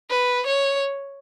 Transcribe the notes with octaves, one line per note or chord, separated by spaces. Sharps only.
B4
C#5